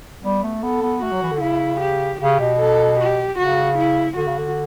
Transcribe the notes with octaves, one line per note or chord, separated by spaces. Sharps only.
G3 B3
A3
B3 A4
B3
A3 F#4
F#3
E3
D3
C#3 E4
G4
C#3 G4
B2
A4
G4
C#3 F#4
E4
D3 F#4
C#3
D3